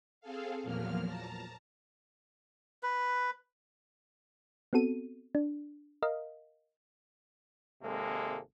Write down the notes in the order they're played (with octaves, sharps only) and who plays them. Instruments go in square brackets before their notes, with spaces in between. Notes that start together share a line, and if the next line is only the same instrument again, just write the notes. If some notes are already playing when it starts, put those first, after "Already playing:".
[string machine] C4 G#4 A4 F5
E2 A#2 F3 F#3 A#3 F6
A5 A#5
[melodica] B4
[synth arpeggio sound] B3 C4 F#4 A4 D#7
D4
A#4 D#5 F5
[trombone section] G#1 C3 G#3 A#3 A4